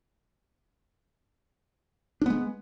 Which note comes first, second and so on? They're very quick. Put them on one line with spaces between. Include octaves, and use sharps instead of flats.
D4 B3 G#3